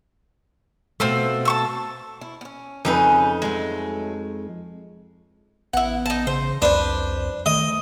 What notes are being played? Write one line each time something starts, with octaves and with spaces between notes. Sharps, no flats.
B2 A3 C4 F4 E6
A5 C#6 E6
E4
B3 C#4
F2 C#3 C#4 D#4 G#4 B4
F#3 G#3 A3
A1 B3 E4 F#5
D#4 A5
C#3 C5
C2 F2 D4 B4 C5
D#3 A3 D#5